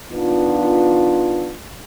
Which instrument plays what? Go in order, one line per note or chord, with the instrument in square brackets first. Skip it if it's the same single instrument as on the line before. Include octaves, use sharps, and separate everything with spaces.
[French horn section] D#3 B3 D4 F4